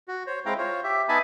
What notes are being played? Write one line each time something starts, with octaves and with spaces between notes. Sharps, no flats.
F#4
C5 C#5
G#3 C4 E4 F5 G5 A#5
F4 C5 C#5
G4 E5
B3 D#4 E5 G#5 A5 B5